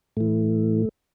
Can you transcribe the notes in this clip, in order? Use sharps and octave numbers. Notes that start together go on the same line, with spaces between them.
A2 E3 A3